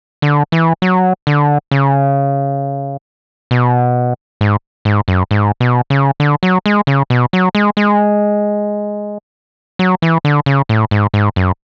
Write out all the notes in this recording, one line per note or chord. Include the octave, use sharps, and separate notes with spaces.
D3
E3
F#3
D3
C#3
B2
G#2
G#2
F#2
G#2
B2
C#3
D3
F#3
G#3
C#3
B2
F#3
G#3
G#3
F#3
E3
D3
C#3
A2
G#2
G#2
F#2